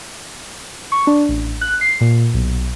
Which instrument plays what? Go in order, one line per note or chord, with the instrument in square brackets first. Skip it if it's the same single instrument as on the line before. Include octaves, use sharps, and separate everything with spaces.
[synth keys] C#6
D4
A1
F#6
C7
A#2
B1